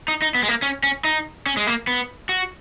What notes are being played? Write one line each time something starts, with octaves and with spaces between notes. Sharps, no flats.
D#4
D#4
B3
G#3
A#3
C#4
C#4
D#4
C#4
G#3
A#3
B3
F#4